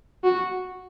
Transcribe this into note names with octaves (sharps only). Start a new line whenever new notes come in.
F#4